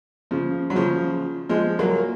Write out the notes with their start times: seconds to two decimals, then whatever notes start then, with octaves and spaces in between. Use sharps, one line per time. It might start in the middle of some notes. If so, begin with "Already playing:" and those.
0.31 C#3 F3
0.70 F#3
0.76 C#3 F3
1.49 F3 G#3
1.79 F#3 A#3